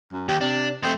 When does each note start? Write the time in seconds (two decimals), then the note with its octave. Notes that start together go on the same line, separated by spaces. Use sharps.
0.12 F#2
0.29 D#2 G4
0.41 C3 D4
0.83 F2 A3 C4